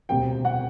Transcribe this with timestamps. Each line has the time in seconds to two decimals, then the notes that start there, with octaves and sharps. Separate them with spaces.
0.09 E1 D2 C3 F#3 C4 G5
0.45 F#5